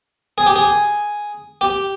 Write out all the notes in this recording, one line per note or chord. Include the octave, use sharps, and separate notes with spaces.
G#4
G4
G#4
G4